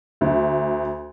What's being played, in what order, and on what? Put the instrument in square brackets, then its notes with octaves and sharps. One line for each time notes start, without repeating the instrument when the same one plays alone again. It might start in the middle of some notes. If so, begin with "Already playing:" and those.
[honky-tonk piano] D2